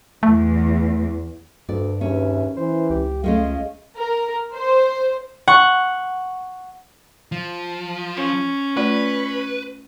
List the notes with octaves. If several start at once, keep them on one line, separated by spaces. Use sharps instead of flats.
E2 A3
D2 G2 D5
D#2 C#4 G#4 B4 E5
E3 C5
C#2 G4
G#3 A3 C#4 F4 D#5 F5
A#4
C5
F#5 C#6
F3
C#4
A3 F4 B4 D5